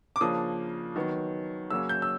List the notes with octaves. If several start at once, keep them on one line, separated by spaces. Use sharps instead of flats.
D6
C#3 F3 A#3 D4 D#6
D#3 F#3 B3
C#3 F#3 A#3 C#4 E6
G6
E6